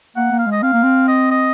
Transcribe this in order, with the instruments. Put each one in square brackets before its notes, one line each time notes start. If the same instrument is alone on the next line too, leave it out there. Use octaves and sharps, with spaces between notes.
[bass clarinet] A#3 [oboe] F#5
[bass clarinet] A#3
[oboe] F5
[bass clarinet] G#3
[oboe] D#5
[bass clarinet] C4 [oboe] F5
[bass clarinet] A#3
C4
[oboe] D#5
D#5